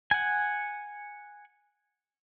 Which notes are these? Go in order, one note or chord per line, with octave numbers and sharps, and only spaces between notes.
F#5 G#5